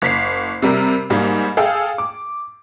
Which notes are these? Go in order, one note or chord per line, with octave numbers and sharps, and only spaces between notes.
F#1 B6 C7
C3 G3 A#4
G#2 G3 A#3
G#4 A4 F5 G5
D6